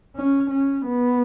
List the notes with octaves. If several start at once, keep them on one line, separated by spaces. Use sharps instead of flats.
C#4
C#4
B3